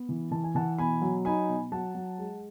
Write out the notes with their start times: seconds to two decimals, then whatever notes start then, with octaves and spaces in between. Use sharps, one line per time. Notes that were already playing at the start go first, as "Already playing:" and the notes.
Already playing: B3
0.09 E3
0.31 E3 A5
0.44 G#5
0.55 E3 F#5 A5
0.78 B2 G#5 B5
1.02 F#3
1.25 D#4 G#5 B5
1.48 B2
1.72 F#3 F#5 A5
1.95 F#3
2.18 G#3